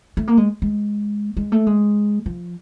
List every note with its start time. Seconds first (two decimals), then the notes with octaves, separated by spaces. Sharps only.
0.17 A3
0.28 A#3
0.37 G#3
0.62 G#3
1.37 G#3
1.52 A3
1.67 G#3
2.26 F3